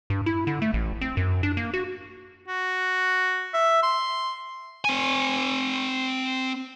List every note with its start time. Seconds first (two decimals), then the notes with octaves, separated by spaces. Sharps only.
0.10 G2
0.26 E4
0.47 D3
0.62 A3
0.74 A1
1.01 C4
1.17 F#2
1.43 D4
1.57 A#3
1.74 F#4
2.48 F#4
3.54 E5
3.83 C6
4.85 C4 G#5